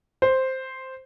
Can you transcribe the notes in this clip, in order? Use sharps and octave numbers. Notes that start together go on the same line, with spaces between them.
C5